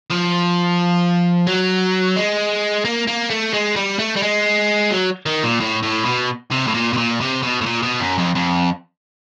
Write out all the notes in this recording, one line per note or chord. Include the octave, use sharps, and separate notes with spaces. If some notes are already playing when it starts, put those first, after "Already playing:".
F3
F#3
G#3
A#3
A#3
A3
G#3
G3
A3
G3
G#3
F#3
D#3
A#2
A2
A2
B2
C3
A2
A#2
B2
A#2
C3
B2
A2
A#2
B2
F#2
F2
F2